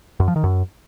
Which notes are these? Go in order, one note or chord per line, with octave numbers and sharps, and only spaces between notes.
F#2
F3
D#3
F#2